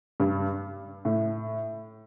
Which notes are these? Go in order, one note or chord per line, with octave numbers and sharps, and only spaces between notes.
G2
A2